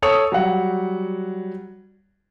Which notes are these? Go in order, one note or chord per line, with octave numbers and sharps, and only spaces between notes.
A4 C#5 D#6 C#7 F7
F#3 G3 F#5